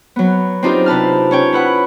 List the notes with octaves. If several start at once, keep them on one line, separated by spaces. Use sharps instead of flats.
F#3 B3
C4 D4 D#4 F4 G4 A#4
C3 B4 A5 F6
C#4 C#5 G5
E4 B4 F#5